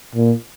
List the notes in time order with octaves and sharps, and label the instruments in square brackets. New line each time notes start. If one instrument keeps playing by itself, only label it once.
[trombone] A#2